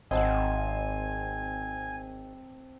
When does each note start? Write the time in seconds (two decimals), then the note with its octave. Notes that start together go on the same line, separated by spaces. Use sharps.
0.11 G#1 C4 C5 D#5 F#5 G#5 A5